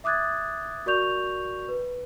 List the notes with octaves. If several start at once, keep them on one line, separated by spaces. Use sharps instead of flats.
E5 D6 D#6 F#6 G#6 A6
F#4 A#4 D5 C#6 G6 F7
B4